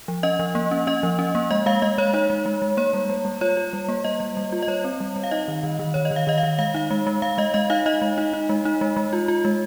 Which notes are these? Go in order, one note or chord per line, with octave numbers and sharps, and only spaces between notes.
F3
C#4 D#5
F3
A#3
C#4
C#4 D#5
F3
C#4
A#3
G#3 D#5
G#3 F5
G#3 D#5
G#3 C#5
D#4 C#5
G#3
G#3
G#3
A#3 C#5
G3
G3
G3
F4 C#5
F4
G3
A#3
G3 D#5
G3
G3
F4
D#5
G3 C#5
C4
G3
G3
F5
D#4 D#5
D#3
D#3
D#3
D#3 C#5
D#5
D#3
F5
D#3 D#5
F5
D#3
G#3 F5
D#4 F5
G#3
G#3
G#3 F5
G#3 D#5
G#3 D#5
D#4 F5
D#4 D#5
G#3
D#4
D#4
G#3
D#4
G#3
G#3
F4
F4
G#3